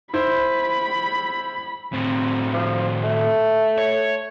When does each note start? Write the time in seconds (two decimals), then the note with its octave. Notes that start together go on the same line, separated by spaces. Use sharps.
0.14 E4 C5 B5
1.93 A2 C4
2.53 F3
3.03 A3
3.78 C#5